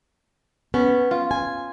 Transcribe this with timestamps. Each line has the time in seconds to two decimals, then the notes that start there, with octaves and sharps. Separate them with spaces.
0.74 B3 C#4
1.11 F4
1.31 G#5